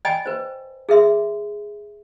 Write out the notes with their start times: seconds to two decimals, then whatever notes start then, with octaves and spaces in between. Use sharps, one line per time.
0.05 D5 D#5 G5 G#5 B5
0.26 B4 C5
0.89 G#4 A#4 E5 C6